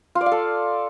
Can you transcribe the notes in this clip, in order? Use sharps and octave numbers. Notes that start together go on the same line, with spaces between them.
F4
D5
F5
A4